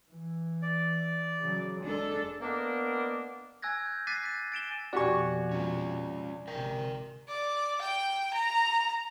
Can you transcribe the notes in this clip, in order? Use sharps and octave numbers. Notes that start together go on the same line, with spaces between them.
E3
D5
C#3 F#3
F#1 G#3 D4 A4
A#3 B3 D4 D5 D#5
G#5 E6 F#6 G#6 A#6
G6
D6 F#6 A6 B6 C7 D#7
D#7
A6 D7 E7 G7
F2 B2 F#4 G4 D5 G#5 C#6
C#4 F4
G#1 C3 A#4 G5
D5
G5
A#5